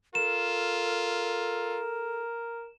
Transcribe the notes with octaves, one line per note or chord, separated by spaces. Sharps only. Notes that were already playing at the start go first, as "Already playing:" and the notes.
F4 A4 A#4 E7